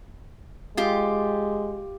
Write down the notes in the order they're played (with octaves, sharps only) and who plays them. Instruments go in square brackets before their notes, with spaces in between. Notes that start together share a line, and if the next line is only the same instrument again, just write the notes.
[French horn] G#3 [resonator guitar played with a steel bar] F4 G4